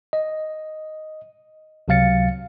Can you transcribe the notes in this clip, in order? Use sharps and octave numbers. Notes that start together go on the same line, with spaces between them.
D#5
C#2 C3 F#3 F5 A6 C#7